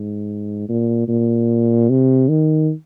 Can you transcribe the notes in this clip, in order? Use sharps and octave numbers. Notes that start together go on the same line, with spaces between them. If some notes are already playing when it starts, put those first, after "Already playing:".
Already playing: G#2
A#2
A#2
C3
D#3